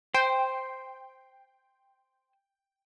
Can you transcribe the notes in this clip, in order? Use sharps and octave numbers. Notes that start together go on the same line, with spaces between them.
C5 G5